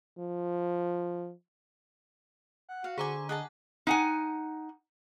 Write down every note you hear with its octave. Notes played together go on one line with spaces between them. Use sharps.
F3
F#5
F#4 F5
D3 G#4 C5 E5 G#5 A#5 D6
G#4 D#5 F#5 A5 F#6
D#4 F#5 G#5